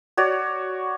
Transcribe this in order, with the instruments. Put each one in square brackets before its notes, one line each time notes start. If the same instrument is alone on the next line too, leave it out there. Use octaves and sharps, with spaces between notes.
[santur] F#4 C#5 D5